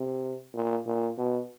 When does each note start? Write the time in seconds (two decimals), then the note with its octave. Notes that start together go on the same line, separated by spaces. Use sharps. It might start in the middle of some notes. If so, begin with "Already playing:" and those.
Already playing: C3
0.54 A#2
0.86 A#2
1.18 B2